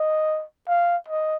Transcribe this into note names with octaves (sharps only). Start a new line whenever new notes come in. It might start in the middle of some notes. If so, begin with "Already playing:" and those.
Already playing: D#5
F5
D#5